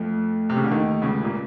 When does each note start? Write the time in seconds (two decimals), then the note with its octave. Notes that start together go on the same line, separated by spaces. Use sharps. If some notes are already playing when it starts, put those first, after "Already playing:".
Already playing: F2 F3 A3
0.50 C3
0.57 C#3
0.64 D3
0.71 D#2 D#3
1.02 C#2 C#3
1.24 A#2